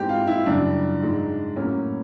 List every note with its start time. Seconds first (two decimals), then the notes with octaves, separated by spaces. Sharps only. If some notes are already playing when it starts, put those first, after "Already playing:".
Already playing: G#2 E3 G#3 C4 G4
0.09 F4
0.27 E4
0.46 F#2 C#3 E3 G3 D4
1.01 G#2 D#3 G#3
1.56 A2 F#3 A#3 C#4